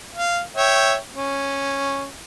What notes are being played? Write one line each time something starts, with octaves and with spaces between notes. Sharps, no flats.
F5
C#5 E5 G5
C#4